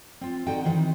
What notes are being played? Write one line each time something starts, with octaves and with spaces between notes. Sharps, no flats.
C4 F4
D3 D#4 F#4 D#5 G5
D#3 E3 C4